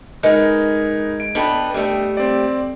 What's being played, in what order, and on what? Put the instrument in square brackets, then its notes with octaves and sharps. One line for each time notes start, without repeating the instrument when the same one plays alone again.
[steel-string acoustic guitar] G#3 [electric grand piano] D#4 A#4 B4
[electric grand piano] D7
[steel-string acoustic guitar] B3 A4 B4 [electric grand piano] D4 D#5 G5
[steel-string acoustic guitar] G3 A3
[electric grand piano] C4 D5